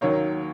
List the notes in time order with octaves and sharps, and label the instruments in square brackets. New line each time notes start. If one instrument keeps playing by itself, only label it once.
[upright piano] D#2 D#3 F#3 A#3 C#5